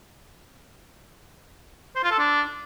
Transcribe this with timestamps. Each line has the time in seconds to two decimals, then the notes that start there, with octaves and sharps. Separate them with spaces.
1.96 C5
2.03 F4
2.11 A4
2.19 D4